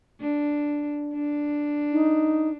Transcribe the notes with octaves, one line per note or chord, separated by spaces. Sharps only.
D4
D4
D#4